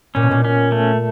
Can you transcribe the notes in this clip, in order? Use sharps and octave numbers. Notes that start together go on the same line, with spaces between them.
A#2 C#4
B2
A#2
C#4
A3